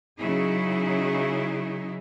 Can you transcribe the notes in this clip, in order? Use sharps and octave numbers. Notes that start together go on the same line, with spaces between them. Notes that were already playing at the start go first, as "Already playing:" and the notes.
C#3 F#3 D#4 E4 G#4